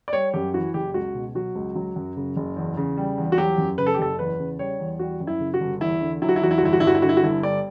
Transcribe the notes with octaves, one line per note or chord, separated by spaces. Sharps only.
D5
G3 C#5
F#2 G4
E3 F#4
F#1 G4
C#2 F#4
B2
F#3 F#4
C#2
F#3
F#2
C#3
F#1
E2
C#3
G3
E2
F#4
F#3 G4
F#2
C#3 B4
A4
G4
F#1 A4
E2 B4
C#3
G3 C#5
E2
G3 F#4
F#2
E4
C#3
F#4
G1
E2 E4
D3
F#3 E4
F#4
E4
E2 F#4
E4
F#4
G1 E4
F#4
G2 E4
F#4
E4
D3 F#4
E4
F#4
G1 E4
G3 D5